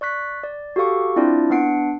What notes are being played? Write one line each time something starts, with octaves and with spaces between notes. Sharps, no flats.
D5 C#6 F#6 B6
D5
F#4 G4 A4 F5 C#6 D6
C4 D4 E4 F4 D5
B3 D4 F#5 C7 D7